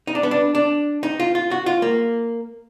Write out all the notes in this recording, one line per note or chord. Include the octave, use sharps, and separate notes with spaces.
D#4
D4
B3
D4
D4
D#4
F4
F4
F#4
F4
A#3